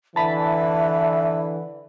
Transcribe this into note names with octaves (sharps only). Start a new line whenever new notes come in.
D3 E3 E5 A5 B5